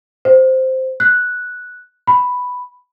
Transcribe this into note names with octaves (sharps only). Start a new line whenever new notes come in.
C5
F#6
B5